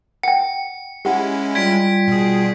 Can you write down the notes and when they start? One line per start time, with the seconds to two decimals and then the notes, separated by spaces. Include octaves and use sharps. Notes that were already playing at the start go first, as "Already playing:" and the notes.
0.23 F#5 G5 C#7
1.05 G#3 C#4 E4 G4 F#5
1.55 G3 F4 G5 G#6 B6 D7
2.08 B2 G#4